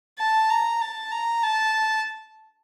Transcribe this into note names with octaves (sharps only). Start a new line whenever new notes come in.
A5
A#5
A5
A#5
A5